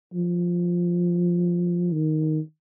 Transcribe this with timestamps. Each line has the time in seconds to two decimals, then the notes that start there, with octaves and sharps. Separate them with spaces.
0.14 F3
1.93 D#3